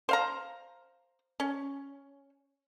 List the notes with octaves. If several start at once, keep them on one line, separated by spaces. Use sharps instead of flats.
C5 F5 A#5
C#4